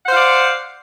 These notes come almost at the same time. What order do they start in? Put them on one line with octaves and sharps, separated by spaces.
F#5 C5 F5 D5